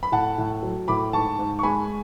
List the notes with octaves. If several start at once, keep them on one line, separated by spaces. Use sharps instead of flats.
B5
A2 F#5 A5
A2
F#3
A2 B5 D6
G#2 A5 C#6
G#2
C#6
G#3 G#5 B5